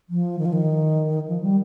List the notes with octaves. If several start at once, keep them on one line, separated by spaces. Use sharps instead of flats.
F3
D#3
F3
D#3
F3
G3